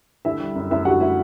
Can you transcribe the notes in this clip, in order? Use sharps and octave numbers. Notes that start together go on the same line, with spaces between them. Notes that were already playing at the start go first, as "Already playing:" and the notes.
D3 E4 E5
G3
F#2
F#2 E4 E5
D3 F#4 F#5
E4 E5